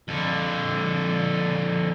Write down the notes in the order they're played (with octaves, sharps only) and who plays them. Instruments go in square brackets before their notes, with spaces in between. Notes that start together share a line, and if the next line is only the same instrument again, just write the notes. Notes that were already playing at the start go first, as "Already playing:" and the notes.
[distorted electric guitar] F2 D3